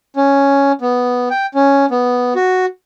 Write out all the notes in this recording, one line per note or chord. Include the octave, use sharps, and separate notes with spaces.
C#4
B3
G5
C#4
B3
F#4